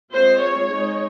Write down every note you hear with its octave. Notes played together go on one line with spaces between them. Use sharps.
G#3 C4 F4 C5
C#5
G#3 D#4